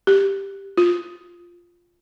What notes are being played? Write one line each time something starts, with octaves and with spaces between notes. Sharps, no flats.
G4
F4